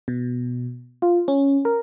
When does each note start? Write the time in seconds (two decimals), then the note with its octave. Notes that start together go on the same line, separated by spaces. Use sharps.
0.08 B2
1.02 F4
1.28 C#4
1.65 A#4